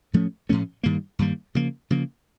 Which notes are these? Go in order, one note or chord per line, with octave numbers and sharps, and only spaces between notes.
A2 F3 A3 C#4
A2 F3 A3 C#4
G2 D#3 G3 A#3
G2 D#3 G3 A#3
C#3 F3 A#3
C#3 F3 A#3